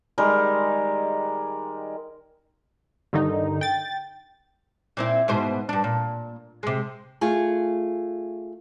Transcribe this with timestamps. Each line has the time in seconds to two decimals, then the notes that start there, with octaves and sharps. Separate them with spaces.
0.18 D#3 G3 G#3 A#4
3.13 G2 D3 D#3 D#4
3.61 G5 A6
4.97 A#2 C4 E4
5.28 G#2 B2 C5
5.69 G2 D4
5.84 A#2
6.63 C3 G#3
7.21 A3 F4 G#4